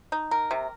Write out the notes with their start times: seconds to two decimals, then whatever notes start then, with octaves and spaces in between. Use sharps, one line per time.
0.12 D#4
0.31 A#4
0.51 C3